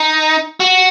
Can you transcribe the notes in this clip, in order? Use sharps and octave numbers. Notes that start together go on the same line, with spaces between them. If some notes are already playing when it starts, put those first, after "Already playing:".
Already playing: D#4
F#4